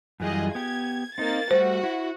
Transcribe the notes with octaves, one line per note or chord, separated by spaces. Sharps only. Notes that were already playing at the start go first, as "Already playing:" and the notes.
F#2 E3 G3 F4 G#4 D#5
B3 G4 G#6
A#3 C4 D#4 A6
G3 A3 F#4 C5
E4